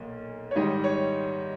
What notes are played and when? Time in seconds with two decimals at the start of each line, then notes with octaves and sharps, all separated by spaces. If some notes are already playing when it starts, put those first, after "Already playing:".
Already playing: B1 A#2 A#3
0.51 C#5
0.56 G#2 D#3 G3 D#5
0.84 C#5